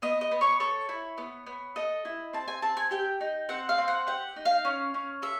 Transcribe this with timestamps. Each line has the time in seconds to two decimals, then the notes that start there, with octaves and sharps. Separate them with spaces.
0.02 B3 D#5
0.21 D#5
0.31 B3
0.41 C#5
0.60 A4 C#5
0.89 E4
1.18 B3
1.47 B3
1.76 A4 D#5
2.05 E4
2.33 C4 A5
2.48 G#5
2.62 C4 A5
2.77 G#5
2.91 G4 G5
3.21 D#4
3.49 C4 F#5
3.69 F5
3.78 C4
3.88 F#5
4.07 G4 F#5
4.36 D#4
4.45 F5
4.65 C#4
4.94 C#4
5.22 A4 E5